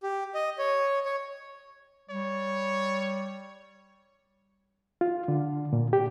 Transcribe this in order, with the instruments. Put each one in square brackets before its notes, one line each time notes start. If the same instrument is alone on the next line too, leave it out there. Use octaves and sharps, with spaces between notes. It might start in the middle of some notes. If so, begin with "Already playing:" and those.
[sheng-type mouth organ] G4
D#5
C#5
C#5
[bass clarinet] G3 [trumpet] C#5
[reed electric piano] F4
D3
A#2
G4